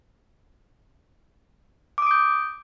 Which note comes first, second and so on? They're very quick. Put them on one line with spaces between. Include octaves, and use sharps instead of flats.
D6 D#6 D7 G6